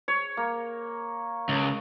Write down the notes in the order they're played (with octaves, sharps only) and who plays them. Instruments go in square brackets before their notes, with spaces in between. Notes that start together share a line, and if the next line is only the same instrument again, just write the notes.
[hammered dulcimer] C#5
A#3
[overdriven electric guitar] C#2